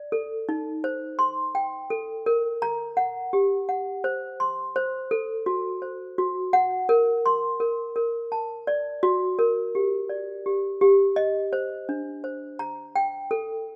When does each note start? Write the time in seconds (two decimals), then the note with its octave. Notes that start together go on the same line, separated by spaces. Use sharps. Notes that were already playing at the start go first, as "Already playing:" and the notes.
Already playing: D5
0.12 A4
0.49 D#4
0.84 C5
1.19 C6
1.55 G5
1.90 A4
2.26 A#4
2.62 A#5
2.97 F#5
3.33 G4
3.69 F#5
4.04 C5
4.40 C6
4.76 C5
5.11 A4
5.46 F#4
5.82 C5
6.18 F#4
6.53 F#5
6.89 A#4
7.26 C6
7.60 A#4
7.96 A#4
8.32 A5
8.67 D5
9.03 F#4
9.39 A#4
9.75 G4
10.09 D5
10.46 G4
10.81 G4
11.16 D#5
11.53 C5
11.89 D4
12.24 C5
12.59 A#5
12.96 G5
13.31 A4